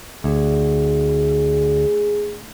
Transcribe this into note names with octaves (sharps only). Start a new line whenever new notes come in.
D2 G#4